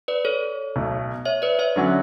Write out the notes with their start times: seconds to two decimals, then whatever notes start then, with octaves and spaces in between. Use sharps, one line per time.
0.08 B4 D5
0.25 A4 C#5
0.76 B1 B2 A3
1.25 C#5 E5
1.42 B4 D5
1.59 C#5 E5
1.76 D3 F#3 C#4 F#4